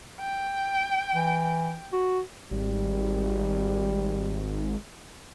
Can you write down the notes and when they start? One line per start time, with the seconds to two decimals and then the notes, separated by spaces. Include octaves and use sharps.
0.20 G5
1.15 E3
1.93 F#4
2.51 G#1 G3